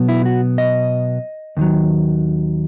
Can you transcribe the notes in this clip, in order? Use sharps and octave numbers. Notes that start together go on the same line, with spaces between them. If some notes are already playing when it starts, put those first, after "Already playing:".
Already playing: B2 F#3 B3
E4
F#4
D#5
D#2 D#3 F#3